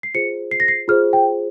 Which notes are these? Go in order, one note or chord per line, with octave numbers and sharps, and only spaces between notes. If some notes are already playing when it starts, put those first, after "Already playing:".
C7
F4 G#4 C5 C#7
C7
A#6
C7
F4 G#4 C5 F6
G5